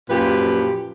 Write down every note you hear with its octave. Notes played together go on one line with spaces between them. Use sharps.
F#2 A#2 F3 G4 B4